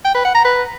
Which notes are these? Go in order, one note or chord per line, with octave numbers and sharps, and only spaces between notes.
G5
B4
F#5
A#5
B4